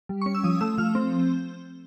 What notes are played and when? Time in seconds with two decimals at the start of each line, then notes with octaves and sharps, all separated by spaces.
0.09 G3
0.22 C#4 C#6
0.35 E6
0.44 F3 D#6
0.61 A3 E6
0.78 F3 F6
0.95 C4